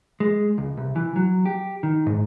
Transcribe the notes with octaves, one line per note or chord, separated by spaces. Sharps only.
G#3
C#2
C2
E3
F#3
G4
D#3
G#2